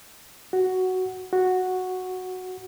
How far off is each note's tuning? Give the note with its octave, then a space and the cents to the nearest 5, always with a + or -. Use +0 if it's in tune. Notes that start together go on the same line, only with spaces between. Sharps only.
F#4 +5
F#4 -5